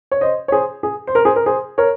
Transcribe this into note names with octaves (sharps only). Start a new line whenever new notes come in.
C#5
C5 D#5
C#5
G#4 C5
G#4
C5
A#4
G#4 C5
A#4
G#4 C5
A#4 C#5